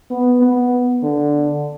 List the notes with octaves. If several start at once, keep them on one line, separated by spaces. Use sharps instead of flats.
B3
B3
D3